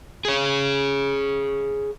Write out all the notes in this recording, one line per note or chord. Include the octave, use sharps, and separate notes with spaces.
G#4 C#5